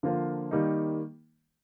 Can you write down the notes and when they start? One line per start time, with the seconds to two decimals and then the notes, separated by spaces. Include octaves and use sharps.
0.03 D3 F3 A#3 F4 C5
0.51 D#3 G3 A#3 D#4